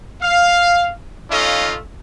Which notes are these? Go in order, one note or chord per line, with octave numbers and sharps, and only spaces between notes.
F5
A3 C#4 D#4 F4 D#5 F5